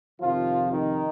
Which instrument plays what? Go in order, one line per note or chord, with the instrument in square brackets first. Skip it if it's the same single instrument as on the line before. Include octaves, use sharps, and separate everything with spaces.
[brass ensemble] F2 C3 D#3 F3 F4
D#3 D#4